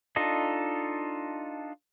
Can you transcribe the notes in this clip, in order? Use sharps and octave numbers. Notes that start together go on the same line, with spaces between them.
D4 D#4 F4 A4 D#5